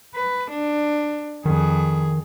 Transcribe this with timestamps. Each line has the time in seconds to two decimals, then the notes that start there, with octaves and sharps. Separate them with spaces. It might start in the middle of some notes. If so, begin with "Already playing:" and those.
0.15 B4
0.51 D4
1.46 F2 D#3 G#4